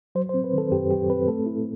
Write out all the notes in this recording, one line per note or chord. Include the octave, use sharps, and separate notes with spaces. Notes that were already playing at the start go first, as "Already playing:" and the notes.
F#3 C5
C5
C4
B4
D#3 A4
F#2 G4
F#3 G4
C4 B4
A3 A4
E4